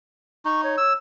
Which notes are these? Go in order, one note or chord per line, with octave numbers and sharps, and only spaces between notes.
D#4 C#6
C#5
E6